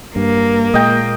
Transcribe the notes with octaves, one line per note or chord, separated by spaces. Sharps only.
G2 A#3
A#2 G#3 D#5 G5